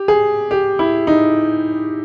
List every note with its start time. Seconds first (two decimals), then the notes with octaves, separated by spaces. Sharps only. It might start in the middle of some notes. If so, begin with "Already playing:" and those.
Already playing: G4
0.08 G#4
0.51 G4
0.79 E4
1.07 D#4